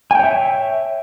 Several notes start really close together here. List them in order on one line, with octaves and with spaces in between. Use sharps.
G#5 G5 C#5 E5